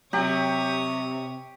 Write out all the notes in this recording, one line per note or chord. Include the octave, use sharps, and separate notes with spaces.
C3 F#3 G4 C#5 D#6